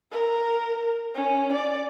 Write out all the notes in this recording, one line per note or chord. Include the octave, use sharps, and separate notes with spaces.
A#4
C#4
D5